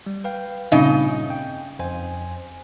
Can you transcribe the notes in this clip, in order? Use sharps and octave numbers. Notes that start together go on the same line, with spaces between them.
G3
B4 F5 G5
G2 A#2 C#3 C4 D#4 D#5
G5
F2 C5 G#5